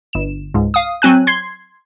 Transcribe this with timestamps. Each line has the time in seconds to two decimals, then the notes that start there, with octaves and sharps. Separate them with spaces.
0.13 G1 E7
0.54 C#2 G#2
0.74 F5 D#6
1.02 F#3 C4 G#5 F#6
1.27 C6 G#6 C7